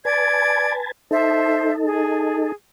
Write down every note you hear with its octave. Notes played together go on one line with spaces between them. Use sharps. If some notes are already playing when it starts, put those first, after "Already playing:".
B4 D5 G#5 A5 G#6
D#4 A4 C5 E5
G#4